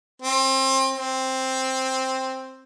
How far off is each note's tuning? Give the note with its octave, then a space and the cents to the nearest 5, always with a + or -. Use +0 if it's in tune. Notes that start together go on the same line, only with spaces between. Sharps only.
C4 +30
C4 +5